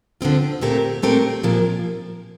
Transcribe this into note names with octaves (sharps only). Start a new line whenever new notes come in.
D3 F3 C4 F4
A#2 A3 C4 G4 A#4
A#2 A3 C4 G4 A#4
A#2 F3 A#3